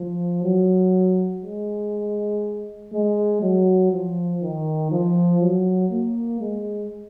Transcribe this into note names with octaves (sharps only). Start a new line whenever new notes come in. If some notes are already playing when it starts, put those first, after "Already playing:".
Already playing: F3
F#3
G#3
G#3
F#3
F3
D#3
F3
F#3
A#3
G#3